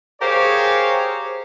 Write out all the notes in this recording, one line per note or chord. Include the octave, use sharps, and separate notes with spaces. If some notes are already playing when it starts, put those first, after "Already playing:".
G4 G#4 A#4 C5 C#5 F5